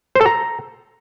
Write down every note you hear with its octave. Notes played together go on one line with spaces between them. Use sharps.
C5
A4
A#5